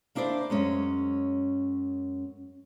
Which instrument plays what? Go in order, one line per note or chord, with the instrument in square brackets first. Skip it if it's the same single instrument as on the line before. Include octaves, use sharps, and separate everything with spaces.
[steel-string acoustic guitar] A#3 D4 E4 C5 D5
F#2 G#3 C#4